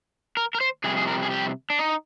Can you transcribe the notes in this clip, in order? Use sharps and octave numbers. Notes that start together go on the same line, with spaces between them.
A#4
A#4
C5
F2 C3 G3 G#4
G#4
A#4
G#4
G4
D4
D#4